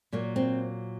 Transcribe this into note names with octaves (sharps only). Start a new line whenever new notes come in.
A#2 F#3 A#3
C4